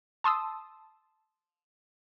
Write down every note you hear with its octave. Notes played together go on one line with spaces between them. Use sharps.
A5 C6 D#6 E6